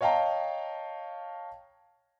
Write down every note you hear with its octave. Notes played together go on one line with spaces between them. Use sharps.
C#5 D#5 F5 G5 A5 A#5